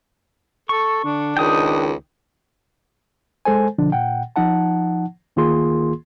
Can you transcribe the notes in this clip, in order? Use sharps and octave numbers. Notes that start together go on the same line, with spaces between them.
A4 C#6
D3 D4
C#2 D#3 G5 D#6
G#3 A4 C5 G#5
B2 D3 F3 D4
A#2 F#5 G5
F3 D#4 F#5 A5
D2 D#3 A#3 F4 G#4 C6